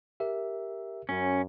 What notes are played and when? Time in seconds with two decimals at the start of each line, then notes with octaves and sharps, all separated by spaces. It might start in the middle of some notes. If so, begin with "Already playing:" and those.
0.20 G4 A#4 E5
1.09 F#2 C#4